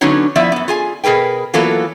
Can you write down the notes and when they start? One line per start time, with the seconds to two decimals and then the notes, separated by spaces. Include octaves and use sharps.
0.01 D3 F#3 B3 C#4 D#4 C#5
0.36 F3 B3 E4 D5 E5
0.52 F#2 B3
0.68 F4 G#4 G#5
1.04 B2 G#4 A#4 B4 G5
1.54 E3 F#3 A#3 B3 F4 A4